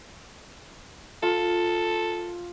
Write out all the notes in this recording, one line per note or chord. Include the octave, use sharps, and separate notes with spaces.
F4 A4